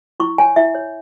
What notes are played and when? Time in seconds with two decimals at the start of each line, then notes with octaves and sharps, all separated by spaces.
0.20 E4 C#6
0.38 C#5 G#5
0.56 E4 E5
0.75 C#5